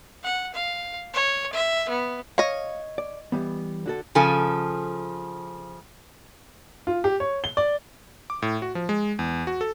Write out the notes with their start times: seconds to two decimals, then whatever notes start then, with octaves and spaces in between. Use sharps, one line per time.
0.23 F#5
0.54 F5
1.13 C#5
1.52 E5
1.89 B3
2.38 C#5 D#5 F5
2.98 D5
3.32 E3 G3 B3
3.86 D3 F#4 A4
4.15 C#3 F3 A4 G#5
6.87 F4
7.04 G4
7.20 C#5
7.44 G7
7.57 D5
8.30 D6
8.42 A2
8.62 F#4
8.75 F3
8.89 G#3
9.19 E2
9.47 F#4
9.61 A4